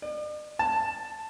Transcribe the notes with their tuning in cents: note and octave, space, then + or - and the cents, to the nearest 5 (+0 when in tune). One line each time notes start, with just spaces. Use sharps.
D5 +45
A5 +5